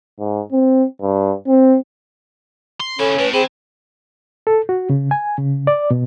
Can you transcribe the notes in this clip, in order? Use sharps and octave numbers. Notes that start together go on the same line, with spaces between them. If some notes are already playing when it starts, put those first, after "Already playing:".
G#2
C4
G2
C4
C6
C#3 C#4 E4 A4
A2 B4
C4 G#4 G#5 B5
A4
F#4
C#3
G#5
C#3
D5
B2